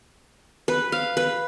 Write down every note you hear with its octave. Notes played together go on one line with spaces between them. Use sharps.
B4
F5
B4